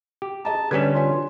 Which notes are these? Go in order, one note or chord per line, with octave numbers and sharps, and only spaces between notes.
G4
G#4 D#5 A5 A#5
D3 G3 C#4 B4 G#6 B6 E7
D4 F4 C#5 G#5